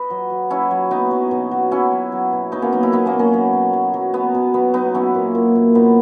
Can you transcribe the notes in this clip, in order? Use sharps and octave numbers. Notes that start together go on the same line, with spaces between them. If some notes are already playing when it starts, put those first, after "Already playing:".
Already playing: B4 D#5
F#3
F#3
F#3 C#4 E4
F#3
F#3 B3 D#4
F#3
B2
F#3
F#3 C#4 E4
F#3
F#3
B2
F#3 B3 D#4
A#3 C#4
F#3 B3 D#4
C#4 E4
F#3 B3 D#4
A#3 C#4
B2
A#3 C#4
F#3 B3
B2
F#3
F#3
B2 B3
B2
F#3 B3
F#3 B3 D#4
F#3 C#4 E4
A#2
A#2
A#2
A#2 B3 D#4